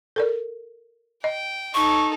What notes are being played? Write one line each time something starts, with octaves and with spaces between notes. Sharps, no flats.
A4 A#4 D5
D#5 G5
D#4 A4 C#6